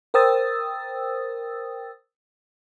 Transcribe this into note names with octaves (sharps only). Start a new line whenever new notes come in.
A#4 C5 G5 D#6 E6 A6